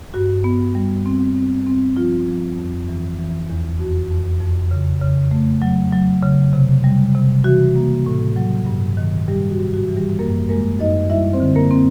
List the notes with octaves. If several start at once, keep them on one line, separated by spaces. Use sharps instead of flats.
G2 F#4
B3
G3
C4
C4
C4
F3 F4
F3
F2
E3
E3
E2
F2 F#4
F2
F2
C#3
C#3
A3
F#3
F#3
C#3
C3
G3
C3
E3 F#4
A#3
A2
F#3
G2
D#3
G3 G4
F#4
G#2
F#4
E3
G3 G4
F#2 A#3 A#4
G#3 A#3 A#4
F#2 D#4 D#5
G3 E4 E5
C4 C5
D3
A#3 A#4
C4